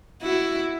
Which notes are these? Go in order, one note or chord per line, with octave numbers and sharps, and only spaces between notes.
E4 F#4